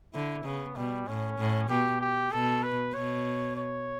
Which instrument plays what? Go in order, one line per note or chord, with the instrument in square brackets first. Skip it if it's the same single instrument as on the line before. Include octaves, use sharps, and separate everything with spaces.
[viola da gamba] D3 [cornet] E4
[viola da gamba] C#3 [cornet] B3
[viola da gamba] B2 [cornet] G3
[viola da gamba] A2 [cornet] C#4
[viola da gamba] A2
[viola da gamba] B2 [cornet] G4
[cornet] G4
[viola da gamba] B2 [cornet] A4
[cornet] B4
[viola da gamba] B2 [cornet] C#5
[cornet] C#5